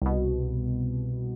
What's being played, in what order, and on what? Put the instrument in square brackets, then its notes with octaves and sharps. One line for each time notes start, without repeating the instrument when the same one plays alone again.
[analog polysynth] C2 B2